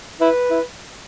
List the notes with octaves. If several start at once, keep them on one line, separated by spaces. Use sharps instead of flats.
E4 B4
E4